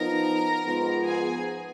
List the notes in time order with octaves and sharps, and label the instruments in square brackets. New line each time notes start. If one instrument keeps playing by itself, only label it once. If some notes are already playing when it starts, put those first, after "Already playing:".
Already playing: [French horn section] F3 B3 D#4 [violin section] A#4 A#5
[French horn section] G#2 F3 B3
[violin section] G#4 G#5